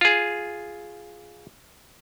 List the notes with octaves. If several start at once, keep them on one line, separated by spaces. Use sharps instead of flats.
F4 G#4